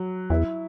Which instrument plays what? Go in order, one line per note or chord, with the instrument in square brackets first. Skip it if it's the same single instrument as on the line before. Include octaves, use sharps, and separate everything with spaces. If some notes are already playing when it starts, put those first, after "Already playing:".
Already playing: [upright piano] F#3
[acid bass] E2 [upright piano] E4